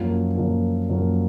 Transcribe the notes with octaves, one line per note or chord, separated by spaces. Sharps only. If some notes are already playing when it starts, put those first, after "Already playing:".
Already playing: F#2 F3 A#3 F4
F#2 F3 A#3 F4
F#2 F3 A#3 F4